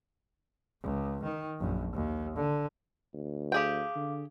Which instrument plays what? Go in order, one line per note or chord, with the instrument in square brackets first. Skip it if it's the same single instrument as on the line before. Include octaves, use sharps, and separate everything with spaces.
[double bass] C#2
D#3
A#1 F#2
D#2
D3
[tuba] D2
[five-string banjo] G4 G#4 G5 [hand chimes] F5 D6
[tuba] D3